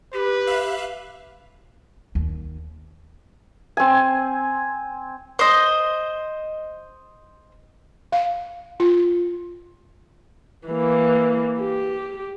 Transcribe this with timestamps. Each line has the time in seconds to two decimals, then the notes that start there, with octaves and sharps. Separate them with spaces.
0.13 G4 B4
0.47 E5 F5 F#6
2.15 D#2
3.77 C4 G#5
5.39 C5 D#5
8.12 F5
8.80 F4
10.68 E3 A#3
11.60 G4